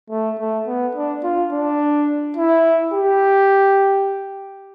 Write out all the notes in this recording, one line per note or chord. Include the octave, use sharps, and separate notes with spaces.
A3
A3
B3
D4
F4
D4
E4
G4